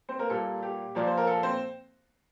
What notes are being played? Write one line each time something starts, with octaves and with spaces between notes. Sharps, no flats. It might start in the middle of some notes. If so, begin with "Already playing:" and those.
C4 C5
A#3 A#4
A#2 G3 A#3 A4
G4
A#2 F3 A#3 D5
C5
A#4
A4
C4 C5